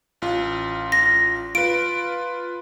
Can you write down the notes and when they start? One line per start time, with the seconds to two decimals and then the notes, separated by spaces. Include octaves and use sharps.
0.22 A1 F4
0.92 A#6
1.55 F4 B4 D7